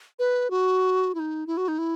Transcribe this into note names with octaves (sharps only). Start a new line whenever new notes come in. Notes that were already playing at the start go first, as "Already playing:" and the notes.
B4
F#4
E4
D#4
E4
F#4
D#4
E4